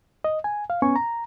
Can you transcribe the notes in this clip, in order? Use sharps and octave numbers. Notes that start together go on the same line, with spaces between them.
D#5
G#5
F5
B3 C#4 G#5 C#6
A#5